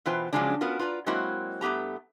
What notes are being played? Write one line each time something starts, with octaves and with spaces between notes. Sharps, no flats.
B2 E3 B3 F4 C5 G5
C#3 F3 F#3 G#3 C#4 D4
B3 C#4 F4 F#4 A#4
F4 B4 D5 A#5
F#3 G#3 A#3 C4 E4 F#4
G2 A3 B3 G4 A#5